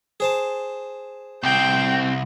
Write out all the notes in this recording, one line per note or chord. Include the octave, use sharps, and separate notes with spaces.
G#4 C5 A5
C2 C4 G5